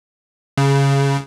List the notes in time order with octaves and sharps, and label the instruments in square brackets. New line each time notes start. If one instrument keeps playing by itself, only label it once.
[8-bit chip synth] C#3